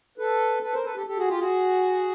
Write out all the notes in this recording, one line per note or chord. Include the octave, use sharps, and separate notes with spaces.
A4 B4
A4 B4
A#4 C5
A4 B4
G4 A4
G4 A4
F#4 G#4
F4 G4
F#4 G#4